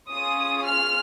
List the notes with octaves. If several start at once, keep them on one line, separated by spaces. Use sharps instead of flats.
C#4 F4 G#4 D#6
F6